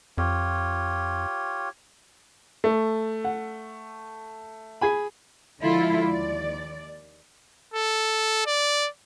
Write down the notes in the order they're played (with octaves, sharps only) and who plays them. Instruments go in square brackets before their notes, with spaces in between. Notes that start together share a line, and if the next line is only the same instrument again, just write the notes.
[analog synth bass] F2 [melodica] F4 G4 C#5
[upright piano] A3
[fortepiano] F#5
G#4 G#5 B5
[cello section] D3 F3 G#3 E4 F4 A4
D#2 D5
[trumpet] A4
D5